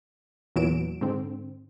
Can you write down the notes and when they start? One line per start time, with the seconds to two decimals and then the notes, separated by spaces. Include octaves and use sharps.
0.56 E2 A#2 E3 F#3 D7 E7
1.01 G#2 D3 C4